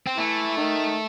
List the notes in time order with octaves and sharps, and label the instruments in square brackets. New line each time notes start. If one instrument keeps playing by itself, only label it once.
[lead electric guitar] C4
[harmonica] E3 [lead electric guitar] A3
[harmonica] D#3